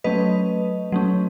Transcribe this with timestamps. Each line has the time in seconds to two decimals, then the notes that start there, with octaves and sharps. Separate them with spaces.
0.04 F#3 A3 C#4 B4 D#5
0.92 F#3 A3 C#4